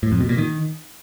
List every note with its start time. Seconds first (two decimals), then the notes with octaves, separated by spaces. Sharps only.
0.03 A2
0.12 F2
0.20 B2
0.29 A#2
0.38 D#3